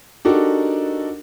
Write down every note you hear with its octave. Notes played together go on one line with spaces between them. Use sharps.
D4 D#4 F#4 G4 A4 A#4